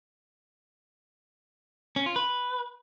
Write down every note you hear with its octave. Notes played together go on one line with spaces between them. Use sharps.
C#4
F4
B4